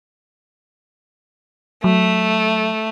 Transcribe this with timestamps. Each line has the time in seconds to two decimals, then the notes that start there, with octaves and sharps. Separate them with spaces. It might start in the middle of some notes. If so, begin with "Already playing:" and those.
1.84 F#3 A3